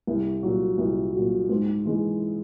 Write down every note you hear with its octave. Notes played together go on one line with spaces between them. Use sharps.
C2
A#2 F#3
C2
A#2 F#3
G#2
E3 G#3